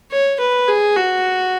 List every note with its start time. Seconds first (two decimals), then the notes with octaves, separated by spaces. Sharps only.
0.11 C#5
0.40 B4
0.68 G#4
0.96 F#4